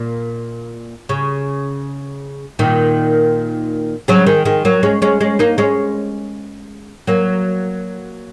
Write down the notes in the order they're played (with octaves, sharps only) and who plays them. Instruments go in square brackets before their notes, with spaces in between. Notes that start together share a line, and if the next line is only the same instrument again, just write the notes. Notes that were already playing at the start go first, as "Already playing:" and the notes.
Already playing: [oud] A#2
C#3
A#2 D#3
C#3 F#3
D#3 G#3
D#3 G#3
F#3 A#3
G#3 C#4
G#3 C#4
G#3 C#4
A#3 D#4
G#3 C#4
F#3 A#3